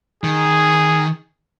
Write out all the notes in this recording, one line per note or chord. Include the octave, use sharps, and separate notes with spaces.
D#3 G#4